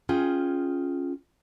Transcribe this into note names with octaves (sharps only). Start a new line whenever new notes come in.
C#4 F4 G#4 G5